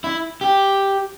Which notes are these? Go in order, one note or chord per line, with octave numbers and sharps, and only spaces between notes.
E4
G4